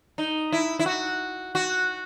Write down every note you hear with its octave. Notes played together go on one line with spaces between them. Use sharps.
D#4
E4
E4
F#4
F#4